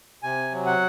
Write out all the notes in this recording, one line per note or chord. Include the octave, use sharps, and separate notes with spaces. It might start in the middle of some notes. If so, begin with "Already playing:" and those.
C3 G#5
F#3
F#5